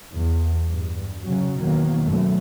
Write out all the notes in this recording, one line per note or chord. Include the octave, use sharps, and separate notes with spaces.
E2
G2
C#3 F#3
E2 B2 D#3 F#3 A#3
B1 F#2 A3